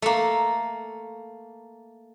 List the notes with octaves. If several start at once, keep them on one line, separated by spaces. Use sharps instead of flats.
A3 A#3